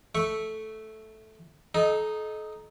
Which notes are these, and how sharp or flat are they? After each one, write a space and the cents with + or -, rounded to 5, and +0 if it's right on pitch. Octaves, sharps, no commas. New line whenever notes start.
A3 -10 E5 -5 C#6 +0
D#4 -5 A4 -35 D#5 +0